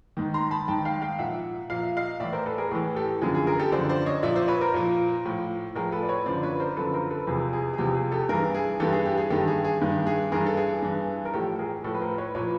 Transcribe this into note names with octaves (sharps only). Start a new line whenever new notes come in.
G#2 D#3
A#5 C6
A5 B5
G#2 D#3 G5 A5
F5 G5
F5 G5
A#2 F3 E5 F#5
A#2 F3 F5
E5
D#5 F5
A2 E3 D5 E5
A#4 C5
A4 B4
G#4 A#4
A2 E3 G#4
G4 A4
F#2 D3 F3 G#4
G#4
G#4 A#4
G4 A4
F#2 D3 F3 C5 D5
C5 D5
C#5 D#5
A#2 F3 D5 E5
C5 D5
B4 C#5
A#4 C5
A#2 F3
A2 F3
A2 F3 G#4 A#4
A4 B4
D5
B4 C#5
F#2 D3 F3 C5 D5
B4 C#5
A#4 C5
F#2 D3 F3 A4 B4
A#4 C5
A4 B4
E2 C3 F3 G#4
G#4
G#4
E2 C3 F3 G4
G#4
G4 A4
G2 E3 G#4 A#4
G#4
G2 E3 G4 A4
G#4
G4
G#4
G2 D#3 G4 A4
G#4
G#4
G2 D#3
G#4
G2 E3 G#4 A#4
A4
G#4
G2 E3
A#4
A2 F3 G4 A4
G#4 A#4
A2 F3 A4 B4
B4
A#4 C5
B4 C#5
A#2 F3 B4 C#5